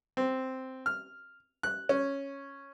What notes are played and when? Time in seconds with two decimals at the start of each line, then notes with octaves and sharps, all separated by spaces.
0.17 C4
0.86 F6
1.63 F#6
1.89 C#4